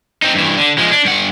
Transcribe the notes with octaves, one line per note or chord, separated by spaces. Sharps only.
C4 D#4
G2 E3
D3
F3 G#3
D4
G2 F#5